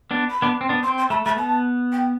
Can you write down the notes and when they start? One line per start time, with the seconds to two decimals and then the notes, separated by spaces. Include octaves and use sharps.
0.11 B3 D4
0.30 B5
0.42 B3 D4
0.61 C4
0.69 B3 D4
0.82 C4 C6
0.97 C6
1.10 A3 B5
1.24 A3 B5
1.37 B3 A5
1.92 G5